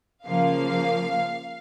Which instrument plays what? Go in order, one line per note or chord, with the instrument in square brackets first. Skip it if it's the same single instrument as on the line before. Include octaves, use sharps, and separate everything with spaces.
[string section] C#3 F3 A#3 F5